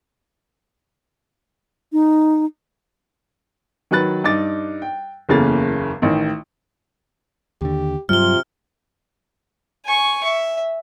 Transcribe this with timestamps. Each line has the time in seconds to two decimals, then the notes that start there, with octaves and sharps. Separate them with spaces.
1.92 D#4
3.91 D#3 F#3 B4 F#6 A6
4.24 G2 D#4 D6 A6
4.82 G5
5.29 F#1 E2 C#3 A#3 A4 A6
6.02 A1 D#3
7.62 D#2 D3 G4
8.09 G2 C3 F#3 G3 F4 F6 G7
9.85 G#5 C#6
10.24 E5